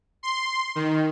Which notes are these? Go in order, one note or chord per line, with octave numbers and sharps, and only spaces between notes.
C6
D#3